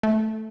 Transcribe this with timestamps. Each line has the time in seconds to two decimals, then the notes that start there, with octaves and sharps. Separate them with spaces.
0.03 A3